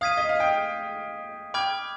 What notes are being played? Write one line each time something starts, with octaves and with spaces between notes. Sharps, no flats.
F5 D#6 G#6 B6 D#7
D#5
F5
G5
G5 B5 D6 F6 G#6